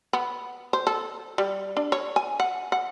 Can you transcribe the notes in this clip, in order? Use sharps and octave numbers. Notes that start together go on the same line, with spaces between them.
B3
C5
A4
G3
D4
C#5
G#5
F#5
F#5